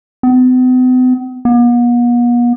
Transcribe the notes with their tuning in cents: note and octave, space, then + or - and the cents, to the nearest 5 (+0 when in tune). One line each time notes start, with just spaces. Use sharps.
B3 +45
B3 -45